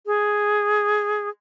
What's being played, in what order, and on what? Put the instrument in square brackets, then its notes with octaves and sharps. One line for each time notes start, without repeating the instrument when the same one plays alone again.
[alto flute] G#4